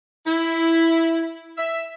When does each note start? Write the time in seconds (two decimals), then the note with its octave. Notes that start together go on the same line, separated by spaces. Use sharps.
0.25 E4
1.56 E5